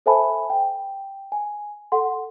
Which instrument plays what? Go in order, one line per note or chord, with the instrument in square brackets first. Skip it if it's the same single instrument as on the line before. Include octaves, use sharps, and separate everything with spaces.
[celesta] A4 C5 E5 G#5 A5 B5
G5
G#5
A4 F#5 C6